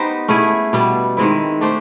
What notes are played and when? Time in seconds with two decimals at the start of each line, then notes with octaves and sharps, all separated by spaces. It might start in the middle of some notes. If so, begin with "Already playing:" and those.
Already playing: B3 D#4 G4 C5
0.28 A3 C#4 E4 G#4
0.73 B2 G3 B3
1.17 D#3 G#3 C4 E4
1.61 A3 D4 G4 C5